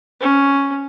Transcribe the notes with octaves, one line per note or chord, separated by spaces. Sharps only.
C#4